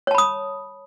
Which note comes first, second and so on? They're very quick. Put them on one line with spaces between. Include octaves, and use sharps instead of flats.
C#5 A5 B5 D#6